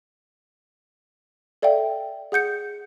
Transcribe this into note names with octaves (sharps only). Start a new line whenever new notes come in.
A4 D5 E5 F5 G5
G#4 F#5 G6 C#7